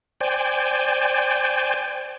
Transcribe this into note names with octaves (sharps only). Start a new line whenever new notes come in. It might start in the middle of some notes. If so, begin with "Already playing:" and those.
C5 D5 G5 G#5